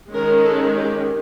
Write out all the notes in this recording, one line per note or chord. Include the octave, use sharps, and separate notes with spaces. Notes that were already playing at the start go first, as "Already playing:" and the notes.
D#3 G#3 C#4 A#4
A4
G4